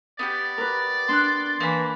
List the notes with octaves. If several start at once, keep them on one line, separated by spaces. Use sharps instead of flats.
B3 F#4 G4 D5
A#4 B4
D4 C6 F#6
E3 A#3 A5 B5